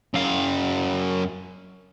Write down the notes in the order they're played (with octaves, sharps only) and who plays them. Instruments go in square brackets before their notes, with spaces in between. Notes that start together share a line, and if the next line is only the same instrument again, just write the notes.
[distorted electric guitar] F#2 F5